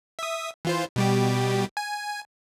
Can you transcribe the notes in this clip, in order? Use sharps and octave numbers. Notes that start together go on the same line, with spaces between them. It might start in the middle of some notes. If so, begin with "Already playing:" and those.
E5 D#6
E3 F4 C5
B2 G3 G4
G#5